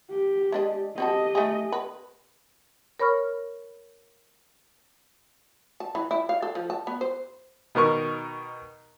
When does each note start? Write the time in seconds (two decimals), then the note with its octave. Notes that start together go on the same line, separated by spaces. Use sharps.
0.10 G4
0.52 G#3 D4 D#5
0.98 C4 F#4 G4 A4 D#5
1.35 A3 G#4
1.72 B4
3.00 A#4 C#5 B5 C#6 F6
5.80 A5
5.95 E3
6.11 E4
6.29 F5
6.42 A4
6.55 F3
6.70 A5
6.87 B3
7.01 C5
7.75 B2 D#3 A#4 C#6